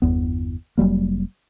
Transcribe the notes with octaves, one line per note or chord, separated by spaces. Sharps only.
G1 E2 B3
F1 F#3 G3 A#3